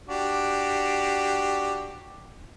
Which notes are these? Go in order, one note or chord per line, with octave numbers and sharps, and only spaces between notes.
D4 F#4 G4